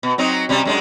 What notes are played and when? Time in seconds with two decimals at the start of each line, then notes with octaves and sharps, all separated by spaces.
0.03 B2
0.18 F#3 C4 D#4
0.49 C3 G3 C#4
0.65 F#2 G#3 D4